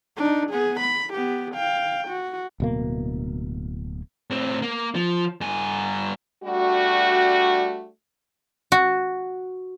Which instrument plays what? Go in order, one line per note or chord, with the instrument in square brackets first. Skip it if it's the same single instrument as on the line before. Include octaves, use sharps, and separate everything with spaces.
[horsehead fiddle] D4 D#4
B3 G#4
B5
B3 G4
F5 G5
F#4
[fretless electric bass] D1 B2 A#3
[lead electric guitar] A2 C4
A#3
F3
G2 G#5
[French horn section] G3 A3 D4 F#4
[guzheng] F#4